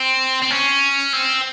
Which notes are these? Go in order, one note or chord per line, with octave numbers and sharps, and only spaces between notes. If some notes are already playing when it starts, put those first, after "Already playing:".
Already playing: C4
C4
C#4
C4